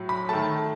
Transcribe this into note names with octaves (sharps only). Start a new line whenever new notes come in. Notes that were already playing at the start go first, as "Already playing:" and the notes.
Already playing: A2 F#3
B5
D#3 A3 A5